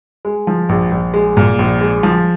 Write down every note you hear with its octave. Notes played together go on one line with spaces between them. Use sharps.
G#3
F3
A#1
A#1
G#3
A#2
A#1
G#3
F3